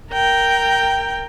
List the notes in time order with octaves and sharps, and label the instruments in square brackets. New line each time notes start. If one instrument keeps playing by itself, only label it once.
[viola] A#4 G5